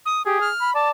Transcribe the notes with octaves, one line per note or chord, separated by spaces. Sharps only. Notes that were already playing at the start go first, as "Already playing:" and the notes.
D#6
G4 G#4
F6
B5
D5 A5